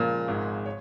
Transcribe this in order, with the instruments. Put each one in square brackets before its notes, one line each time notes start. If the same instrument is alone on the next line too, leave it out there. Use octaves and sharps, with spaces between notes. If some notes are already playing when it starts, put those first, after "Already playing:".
Already playing: [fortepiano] A#2 [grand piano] C#3 F3 G#3
[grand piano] G#1 G#2 G#3
C#5